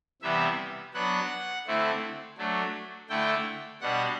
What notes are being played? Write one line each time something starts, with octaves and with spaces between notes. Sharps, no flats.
C3 E3 G3 B3 E5
F#3 B3 D4 F#5
D3 A3 C4 E4
F#3 A3 D4
D3 A3 E4 G5
B2 G3 D4 F#5